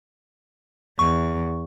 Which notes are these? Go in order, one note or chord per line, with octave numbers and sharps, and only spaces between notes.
E2 C#6